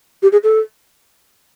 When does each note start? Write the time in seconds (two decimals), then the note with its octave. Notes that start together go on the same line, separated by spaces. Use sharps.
0.23 G4
0.32 G#4
0.44 A4